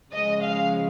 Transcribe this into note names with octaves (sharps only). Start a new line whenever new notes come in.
C#3 F3 G#3 D#5
F5